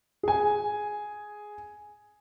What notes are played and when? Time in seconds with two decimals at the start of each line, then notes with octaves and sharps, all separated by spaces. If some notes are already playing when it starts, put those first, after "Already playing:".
0.23 G#4 G#5